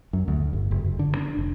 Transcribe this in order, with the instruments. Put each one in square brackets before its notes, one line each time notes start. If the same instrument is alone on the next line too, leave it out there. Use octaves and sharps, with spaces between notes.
[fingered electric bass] F#2
D2
G1
F#1
F#1
D3
D4
F1